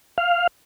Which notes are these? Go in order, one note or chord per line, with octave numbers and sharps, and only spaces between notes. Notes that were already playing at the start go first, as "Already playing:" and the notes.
F5